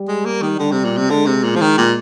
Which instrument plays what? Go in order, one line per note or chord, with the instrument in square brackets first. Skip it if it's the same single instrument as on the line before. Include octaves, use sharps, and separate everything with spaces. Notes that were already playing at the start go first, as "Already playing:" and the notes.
Already playing: [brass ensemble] G3
[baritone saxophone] G#3
A#3
D#3
[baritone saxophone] D3 [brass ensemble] G3
[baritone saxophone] C3
A#2
C3
[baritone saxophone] D3 [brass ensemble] G#3
[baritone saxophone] C3
A#2
F3
D#3
A#2